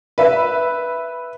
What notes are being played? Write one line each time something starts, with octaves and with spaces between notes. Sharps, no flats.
B4 E5